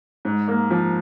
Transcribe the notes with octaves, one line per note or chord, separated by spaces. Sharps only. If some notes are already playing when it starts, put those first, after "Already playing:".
G#2
A#3
F3